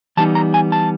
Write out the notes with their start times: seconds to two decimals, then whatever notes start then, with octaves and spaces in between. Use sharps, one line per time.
0.17 E3 G3 B3 D#4 A5
0.35 A#5
0.54 G#5
0.72 A5